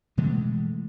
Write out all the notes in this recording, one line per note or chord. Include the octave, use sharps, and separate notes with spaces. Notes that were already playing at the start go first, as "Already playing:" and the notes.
B2 E3 G#3 A3